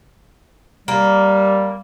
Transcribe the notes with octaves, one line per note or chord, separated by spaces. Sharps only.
G3 A#3